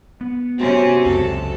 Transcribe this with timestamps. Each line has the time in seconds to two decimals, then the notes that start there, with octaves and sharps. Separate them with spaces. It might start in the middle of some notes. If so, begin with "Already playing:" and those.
0.21 B3
0.59 C3 C4 C#4 F#4
1.06 C#2 F#2 A4